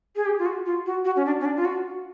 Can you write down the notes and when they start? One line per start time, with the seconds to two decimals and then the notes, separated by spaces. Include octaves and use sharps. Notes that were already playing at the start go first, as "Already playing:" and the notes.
0.16 G#4
0.26 G4
0.39 F4
0.46 F#4
0.66 F4
0.86 F#4
1.05 F#4
1.16 C#4
1.25 D4
1.40 C#4
1.45 D4
1.56 F4
1.65 F#4